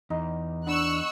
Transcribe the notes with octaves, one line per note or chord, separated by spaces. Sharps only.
E2 D#4
B3 D4 C#6 E6 F#6